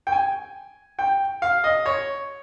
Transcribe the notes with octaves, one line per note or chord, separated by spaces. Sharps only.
G5
G#5
G5
F5
D#5
C#5